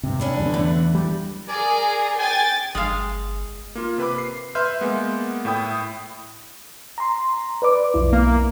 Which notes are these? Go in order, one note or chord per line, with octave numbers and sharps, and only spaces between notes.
G2 C3
C#4 D4 E4
E2 D3
E3 A3 F#5
G3
G#4 A#4 D5 G#5
G5 G#5 A6
G1 G#3 F5
A#3 F4
C3 B4 B5 D6
C7
B4 E5 C6 F6 G6
G#3 A#3 B3
A2 E4 G5 D#6
A#5 C6
B4 D5 D6
B1 F2 E4
A#3